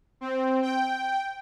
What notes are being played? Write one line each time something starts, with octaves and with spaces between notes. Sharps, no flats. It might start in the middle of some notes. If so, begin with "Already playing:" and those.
C4
G5